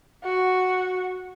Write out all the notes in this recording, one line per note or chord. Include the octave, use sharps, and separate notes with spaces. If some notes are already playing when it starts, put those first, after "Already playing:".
F#4